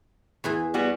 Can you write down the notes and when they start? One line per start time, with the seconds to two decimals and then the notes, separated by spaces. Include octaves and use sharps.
0.44 E2 E3 G#4
0.74 G3 B3 F#4